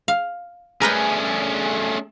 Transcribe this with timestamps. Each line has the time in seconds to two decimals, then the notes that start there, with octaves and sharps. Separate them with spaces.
0.08 F5
0.82 A3 C#4 D4 G#4 A#4 B4 G5